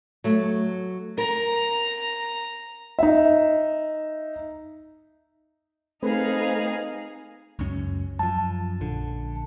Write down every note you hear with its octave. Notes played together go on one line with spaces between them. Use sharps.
F#3 A3
A#4 A#5
D#4 E5
A3 C4 D#4 G#4 B4 F5
C#2 F#2 C#4
F#2 F3 A5
A#1 D3